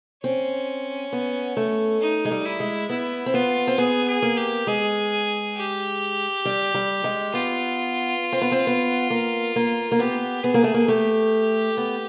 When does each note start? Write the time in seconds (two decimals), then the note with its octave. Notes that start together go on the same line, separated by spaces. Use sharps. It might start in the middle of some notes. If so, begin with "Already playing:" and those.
0.24 C4 C#4
1.13 B3
1.57 A3
2.01 D#4
2.25 G#3
2.31 G3
2.45 E4
2.60 G#3
2.89 B3 E4
3.26 C4
3.34 B3 F4
3.67 C4
3.78 B3 G#4
4.08 G#4
4.22 A#3
4.37 G4
4.67 G#3 G#4
5.56 G4
6.45 G3
6.74 G3
7.04 G#3
7.34 B3 F4
8.32 C4
8.42 B3
8.52 C4
8.67 B3
9.10 A#3
9.56 A#3
9.92 A#3
9.99 B3 G4
10.43 B3 G#4
10.54 A#3
10.64 A3
10.74 A#3
10.88 A3 G4
11.77 B3